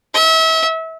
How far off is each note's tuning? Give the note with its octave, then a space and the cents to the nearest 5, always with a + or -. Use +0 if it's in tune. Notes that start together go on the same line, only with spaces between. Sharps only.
E5 -35